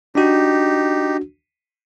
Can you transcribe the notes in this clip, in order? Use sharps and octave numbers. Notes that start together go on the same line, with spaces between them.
D4 D#4 F#4 G4